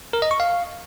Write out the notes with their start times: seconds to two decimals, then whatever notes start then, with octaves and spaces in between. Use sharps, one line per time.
0.13 A#4
0.22 D#5
0.31 C#6
0.40 F5